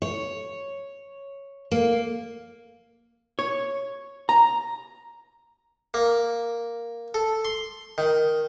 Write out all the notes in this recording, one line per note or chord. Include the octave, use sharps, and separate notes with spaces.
C#5
A#3
C#5
A#5
A#3
A4
C6
D#3